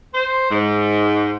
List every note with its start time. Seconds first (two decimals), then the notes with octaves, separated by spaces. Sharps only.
0.15 C5
0.51 G#2